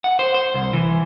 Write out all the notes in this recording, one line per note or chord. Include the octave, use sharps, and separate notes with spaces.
F#5
C5
C5
C2
E3